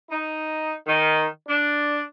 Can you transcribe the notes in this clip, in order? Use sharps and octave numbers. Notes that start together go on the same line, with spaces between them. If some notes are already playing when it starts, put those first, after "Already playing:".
D#4
D#3
D4